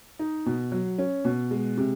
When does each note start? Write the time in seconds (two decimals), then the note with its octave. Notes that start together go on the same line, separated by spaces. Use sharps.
0.19 D#4
0.46 B2
0.72 F#3
0.98 C#4
1.25 B2
1.51 G#3
1.77 C3